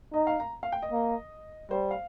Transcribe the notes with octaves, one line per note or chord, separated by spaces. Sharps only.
D#4 D#5
F5
A#5
F5
G5
D#5
A#3
G3 C5
F5